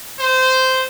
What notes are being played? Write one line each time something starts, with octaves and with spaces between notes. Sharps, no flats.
C5